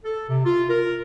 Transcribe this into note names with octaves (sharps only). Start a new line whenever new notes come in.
A4
C3
F4
A#4